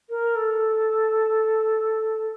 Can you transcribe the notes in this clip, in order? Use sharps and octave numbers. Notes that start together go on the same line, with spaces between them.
A#4
A4